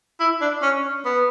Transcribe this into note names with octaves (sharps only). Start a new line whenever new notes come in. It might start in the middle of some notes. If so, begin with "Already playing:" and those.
E4
D4
C#4
B3